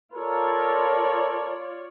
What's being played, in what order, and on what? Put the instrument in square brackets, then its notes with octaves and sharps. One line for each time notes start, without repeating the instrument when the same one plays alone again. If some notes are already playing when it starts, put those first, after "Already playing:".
[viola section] F4 C#5 D5 [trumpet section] A4 A#4